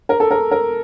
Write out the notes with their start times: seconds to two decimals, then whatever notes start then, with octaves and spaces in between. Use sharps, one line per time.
0.09 A#4
0.20 A4
0.31 A#4
0.51 A#4